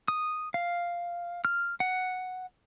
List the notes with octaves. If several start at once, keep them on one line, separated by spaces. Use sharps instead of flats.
D#6
F5
F6
F#5